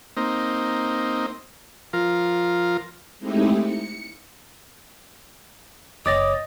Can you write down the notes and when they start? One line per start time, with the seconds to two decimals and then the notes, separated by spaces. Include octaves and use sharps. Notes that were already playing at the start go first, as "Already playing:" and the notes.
0.17 A#3 C4 D#4
1.93 F3 F4 A#4
3.19 G#3 A3 C4 D#4 E4 G4
3.61 C#7
6.06 F#1 C#3 C#5 D#5 G5 D6 A6 A#6